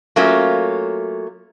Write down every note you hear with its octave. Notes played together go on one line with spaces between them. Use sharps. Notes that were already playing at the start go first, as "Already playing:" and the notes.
F#3 A3 A#3 C#4 F4